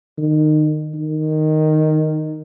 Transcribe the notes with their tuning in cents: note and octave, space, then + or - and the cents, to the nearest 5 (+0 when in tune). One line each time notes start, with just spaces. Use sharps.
D#3 -25
D#3 -5